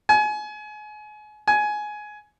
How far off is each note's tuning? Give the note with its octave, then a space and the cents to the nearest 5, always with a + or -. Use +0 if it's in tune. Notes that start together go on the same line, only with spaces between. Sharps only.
G#5 +30
G#5 +15